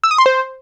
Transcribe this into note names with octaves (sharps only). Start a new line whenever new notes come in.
E6
D#6
C6
C5